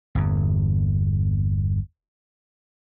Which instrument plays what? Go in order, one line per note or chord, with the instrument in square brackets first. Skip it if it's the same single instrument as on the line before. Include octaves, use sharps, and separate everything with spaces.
[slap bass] G1 E2